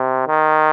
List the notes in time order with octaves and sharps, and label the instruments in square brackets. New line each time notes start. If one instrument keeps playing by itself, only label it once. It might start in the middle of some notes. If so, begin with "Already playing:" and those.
Already playing: [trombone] C3
D#3